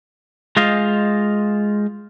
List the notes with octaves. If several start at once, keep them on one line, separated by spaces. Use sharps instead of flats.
G#3 F4 C5 D#5 F5